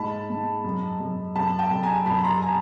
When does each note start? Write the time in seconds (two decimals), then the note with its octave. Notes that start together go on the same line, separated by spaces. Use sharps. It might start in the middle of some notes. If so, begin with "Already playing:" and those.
Already playing: G#2 A5 B5
0.30 G#2
0.64 F#2
1.00 F#2
1.36 F#2 A5 B5
1.59 G5 A5
1.71 F#2
1.83 G#5 A#5
2.06 F#2 A5 B5
2.18 B5
2.24 A#5 C6
2.41 G#5 A#5